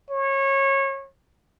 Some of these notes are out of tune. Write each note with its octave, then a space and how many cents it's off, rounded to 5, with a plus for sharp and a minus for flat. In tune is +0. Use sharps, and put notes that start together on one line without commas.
C#5 -25